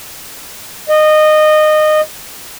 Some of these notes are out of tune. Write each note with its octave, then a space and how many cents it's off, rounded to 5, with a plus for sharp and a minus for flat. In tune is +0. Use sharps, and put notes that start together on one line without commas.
D#5 -20